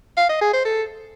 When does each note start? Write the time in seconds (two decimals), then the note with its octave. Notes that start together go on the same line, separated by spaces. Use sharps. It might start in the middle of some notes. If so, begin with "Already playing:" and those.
0.17 F5
0.29 D#5
0.41 G#4
0.53 C5
0.65 A4